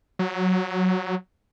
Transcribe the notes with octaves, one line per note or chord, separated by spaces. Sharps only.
F#3